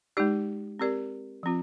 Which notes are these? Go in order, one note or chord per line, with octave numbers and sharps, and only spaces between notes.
G#3 D#4 G4 D5
C4 G4 A#4 D5
F3 C4 F4